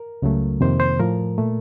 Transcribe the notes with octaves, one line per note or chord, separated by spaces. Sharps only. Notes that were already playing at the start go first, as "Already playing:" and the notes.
Already playing: A#4
C#2 C#3 F#3 A3
F2 C3 D#3 A#3 C5
C5
A2 F3 A3 A#4
A#2 A3